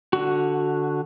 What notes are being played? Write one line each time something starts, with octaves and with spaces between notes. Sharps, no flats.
D3 F#4